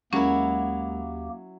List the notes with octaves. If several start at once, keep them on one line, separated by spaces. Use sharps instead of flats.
D#2 F#3 G#3 A#3 C#4 E4 G4 A#4